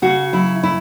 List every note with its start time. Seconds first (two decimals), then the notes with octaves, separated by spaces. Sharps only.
0.02 C#3 F#4
0.33 F#3 E4
0.63 E4